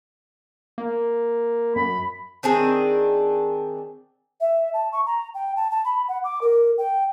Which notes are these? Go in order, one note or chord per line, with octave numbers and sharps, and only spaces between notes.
A#3
F#2 B5
D#3 C4 D4 G#4
E5
A5
C#6
A#5
G5
A5
A5
B5
F#5
D6
A#4
G5